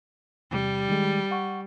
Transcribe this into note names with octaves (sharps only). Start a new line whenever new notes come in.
E2 C3 G3
D#3 G#3
F#5 C#6